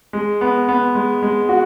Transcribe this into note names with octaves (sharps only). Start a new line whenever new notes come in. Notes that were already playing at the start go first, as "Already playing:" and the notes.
G#3
B3
B3
G#3
G#3
F#4